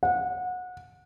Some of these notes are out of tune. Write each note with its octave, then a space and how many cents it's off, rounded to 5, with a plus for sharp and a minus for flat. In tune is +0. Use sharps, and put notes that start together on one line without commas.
F#5 -25